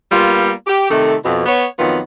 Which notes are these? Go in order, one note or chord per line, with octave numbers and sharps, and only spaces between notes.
G3 A#3 B3 F4
G4
C3 D#3 A3
F2 B2
B3 C#5
F2 D#3 F#3 B3 F4